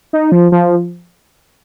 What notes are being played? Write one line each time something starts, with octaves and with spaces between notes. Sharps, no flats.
D#4
F3
F3